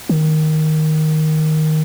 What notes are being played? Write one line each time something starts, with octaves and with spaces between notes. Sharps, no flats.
D#3